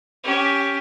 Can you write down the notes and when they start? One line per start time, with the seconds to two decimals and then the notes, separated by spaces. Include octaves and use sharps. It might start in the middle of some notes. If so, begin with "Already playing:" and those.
0.23 C#4 G4